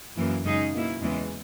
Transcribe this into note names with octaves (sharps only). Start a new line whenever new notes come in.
F#2 E3 A#3
F#2 C#3 G#3 D#4 G#4
B2 A#3 E4
E2 C#3 E3 G#3 B3